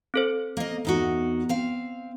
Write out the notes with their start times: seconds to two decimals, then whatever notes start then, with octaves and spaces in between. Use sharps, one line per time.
0.14 C4 A4 C5
0.57 A#3 D#5
0.85 E2 D#4 F#4
1.49 C4 F5